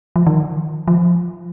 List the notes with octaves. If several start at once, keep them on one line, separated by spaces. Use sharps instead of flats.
F3
D#3
F3